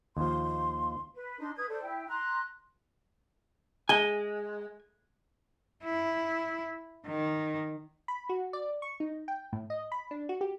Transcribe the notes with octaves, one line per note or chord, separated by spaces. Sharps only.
D#2 F3 C6
B4
D4 D#4 C6
B4 D#6 G#6
A4 C5 D5
E4 G5
A#5 C6 F#6
G#3 G#5 D#7 G7
E4
D#3
B5
F#4
D5
C#6
D#4
G5
A2
D#5
B5
D4
F#4
G4